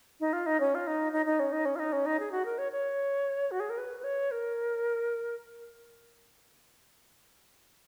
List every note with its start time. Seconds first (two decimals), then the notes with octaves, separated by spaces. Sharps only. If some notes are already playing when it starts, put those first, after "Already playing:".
0.20 D#4
0.33 F4
0.46 D#4
0.60 C#4
0.75 F4
0.87 D#4
1.12 D#4
1.26 D#4
1.39 C#4
1.52 D#4
1.65 C#4
1.76 F4
1.79 D#4
1.92 C#4
2.06 D#4
2.19 G#4
2.32 F#4
2.45 A#4
2.58 C#5
2.72 C#5
3.51 F#4
3.60 G#4
3.70 A#4
3.78 B4
4.00 B4
4.04 C#5
4.31 A#4